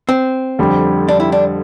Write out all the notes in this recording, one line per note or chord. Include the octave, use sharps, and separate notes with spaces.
C4
F2 D3 G3
D4
E4
D4